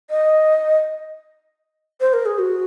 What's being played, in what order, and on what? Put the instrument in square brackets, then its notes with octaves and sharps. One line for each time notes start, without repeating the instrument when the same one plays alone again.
[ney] D#5
C5
A#4
G#4
F#4